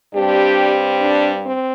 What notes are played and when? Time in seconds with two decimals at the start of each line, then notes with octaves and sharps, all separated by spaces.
0.14 G2 G3 C4 D4 G4
1.00 D4
1.44 C4